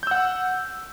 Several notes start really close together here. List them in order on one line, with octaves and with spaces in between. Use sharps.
G6 E6 F#5